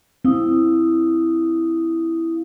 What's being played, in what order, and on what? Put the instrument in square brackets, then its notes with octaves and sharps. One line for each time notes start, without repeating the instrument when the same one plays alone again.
[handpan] C4 [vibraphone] E4 F5 D#6